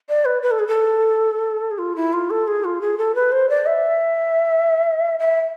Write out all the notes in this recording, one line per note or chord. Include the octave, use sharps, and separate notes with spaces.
D5
B4
B4
A4
G#4
A4
G#4
F4
E4
F4
A4
G#4
F4
G#4
A4
B4
C5
D5
E5
E5